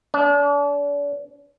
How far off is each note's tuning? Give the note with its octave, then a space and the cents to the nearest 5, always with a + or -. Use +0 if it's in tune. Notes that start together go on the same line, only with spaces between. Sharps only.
D4 -40